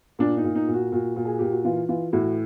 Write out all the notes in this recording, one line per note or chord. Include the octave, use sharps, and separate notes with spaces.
A#2 D4
D#4
A#2
D#4
A#2
F#4
A#2 F#4
A#2
G#4
A#2 G4
F#4
E3 F4
E3 F4
A2 F#4